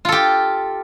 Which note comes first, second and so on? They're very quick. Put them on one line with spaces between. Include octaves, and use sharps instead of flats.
F4 A4 G4